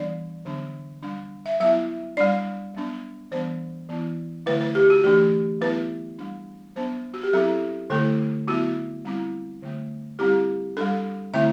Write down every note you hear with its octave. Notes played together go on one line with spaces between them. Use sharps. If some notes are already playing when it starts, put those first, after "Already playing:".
Already playing: E3 G3 B3 D4 D5
D3 F#3 B3 D4
G3 D4
E5
F#3 B3 E4 E5
G3 D4 D5
F#3 B3 D4
E3 G3 B3 D4 C5
E3 B3 E4
D3 F#3 A3 E4 B4
B4
G4
F#4
E3 A3 D4 G4
F#3 B3 E4 B4
G3 D4
F#3 B3 D4 C5
F#4
G4
F#3 C4 E4 A4
D3 A3 E4 A4
F#3 B3 E4 F#4
G3 C4 E4
D3 F#3 A3
G3 C4 E4 G4
G3 D4 A4
D3 A3 C4 E4 E5